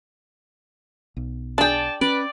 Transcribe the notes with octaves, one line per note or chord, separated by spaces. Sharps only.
B1
D4 G#4 D5 G5 A5
C#4 B4 D5